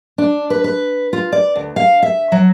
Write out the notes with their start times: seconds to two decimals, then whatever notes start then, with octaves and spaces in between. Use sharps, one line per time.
0.18 D4
0.50 B4
0.64 B4
1.13 F4
1.32 D5
1.55 D2
1.76 F5
2.02 E5
2.32 F#3